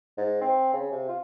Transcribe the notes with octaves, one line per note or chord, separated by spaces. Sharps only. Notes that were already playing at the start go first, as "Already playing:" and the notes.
G#2
C4
C#3
C3
F4